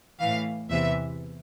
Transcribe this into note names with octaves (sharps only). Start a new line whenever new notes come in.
A2 E3 F5
E2 C3 E3 E5